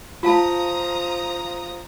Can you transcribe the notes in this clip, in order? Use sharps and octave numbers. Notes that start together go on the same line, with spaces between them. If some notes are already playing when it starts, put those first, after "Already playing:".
F3 F4 F5 A5 A#5 D#6